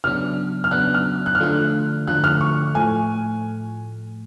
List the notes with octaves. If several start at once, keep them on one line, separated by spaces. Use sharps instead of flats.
C#3 F#3 B3 D4 F6
F6
C#3 F#3 B3 D4 F#6
F6
F#6
F6
D3 F3 A3 D4 F4 F#6
D3 F3 A3 D4 F4 F#6
F6
C#6
A2 F3 A3 G#5